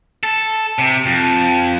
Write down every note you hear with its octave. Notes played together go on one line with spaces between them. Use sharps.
A4
C3
F2